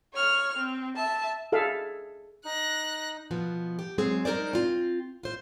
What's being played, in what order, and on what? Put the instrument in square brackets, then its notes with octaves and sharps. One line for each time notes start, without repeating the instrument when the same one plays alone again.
[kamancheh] C#5 F6
C4
E5 A5
[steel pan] G#4 A4 E5 F5
[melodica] D#4 [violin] F#6 A#6
[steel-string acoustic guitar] B2 F3 B3
G4
F#3 G#3 C4 G#4
G#3 D#4 A#4 C5 D5
C4 F4
F4 C5